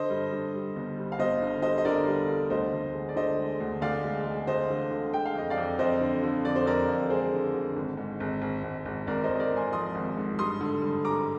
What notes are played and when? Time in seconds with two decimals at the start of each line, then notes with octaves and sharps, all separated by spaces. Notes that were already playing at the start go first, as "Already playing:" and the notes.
Already playing: D3 C5 D#5
0.10 G2
0.31 G2
0.54 G3
0.76 G1
0.97 G3
1.12 F5
1.19 G1 C5 D#5
1.42 D3
1.62 G3 C5 D#5
1.78 D#5
1.85 D3 A#4 D5
2.07 G3
2.28 D3
2.50 D2 C5 D#5
2.73 D2
2.94 G#3
3.09 D5
3.16 D3 C5 D#5
3.38 G#3
3.60 D2
3.81 D2 D5 F5
4.04 G#3
4.26 G#3
4.47 D2 C5 D#5
4.70 D3
4.91 D3
5.13 G#3 G5
5.26 F5
5.35 F2 D#5
5.50 D5 F5
5.57 F2
5.79 F2 C5 D#5
6.01 D3
6.23 D3
6.45 F2 D5
6.56 C5
6.66 F2 A#4 D5
6.88 F2
7.10 G#3 G#4 C5
7.33 D3
7.54 D3
7.76 G#1
7.97 G#2
8.20 G#1
8.41 G#1
8.63 G#1
8.85 G#1
9.07 G#1 A#4 D5
9.24 C5 D#5
9.29 G#1
9.35 D#5
9.40 A#4 D5
9.52 G#2 G#5 C6
9.72 F3 C6 D#6
9.95 G#1
10.17 G#2
10.39 G2 C6 D#6
10.61 D3
10.82 G2
11.04 G2 A#5 D6